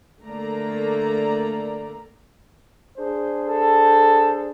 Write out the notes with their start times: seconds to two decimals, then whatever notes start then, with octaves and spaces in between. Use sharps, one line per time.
0.22 D3 A3 A#3 D5 A#5
2.97 D4 G#4 C5
3.48 A4